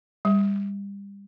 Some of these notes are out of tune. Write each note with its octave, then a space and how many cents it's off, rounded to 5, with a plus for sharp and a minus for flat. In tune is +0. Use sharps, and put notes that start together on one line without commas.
G3 +30